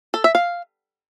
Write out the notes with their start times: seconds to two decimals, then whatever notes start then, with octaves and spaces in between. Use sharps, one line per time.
0.14 A4
0.24 E5
0.35 F5